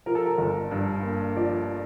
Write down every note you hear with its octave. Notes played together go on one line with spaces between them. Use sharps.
F3 A#4
A4
A#4
G1
G2
A#3
F3 D5